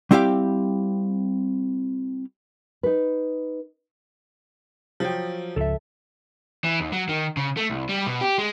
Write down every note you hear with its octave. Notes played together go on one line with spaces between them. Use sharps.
G3 C4 E4 G4 F5 G5
D#4 B4
F3 F#3 G5
C#2 F3 A4 E5
E3
D#2
F#3
D#3
C#3
A3
C2
G3
B2
G4
G#3